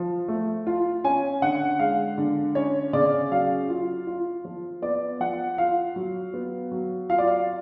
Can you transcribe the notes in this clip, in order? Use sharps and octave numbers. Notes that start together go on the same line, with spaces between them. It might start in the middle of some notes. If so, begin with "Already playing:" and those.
Already playing: F3
A3
F4
C#4 G#5
D3 F#5
G#3 F5
D3
C#4 C#5
C#3 D5
F#3 F5
F4
F4
F3
B3 D5
F3 F#5
F4 F5
F#3
B3
F#3
F4 F5
D5
F5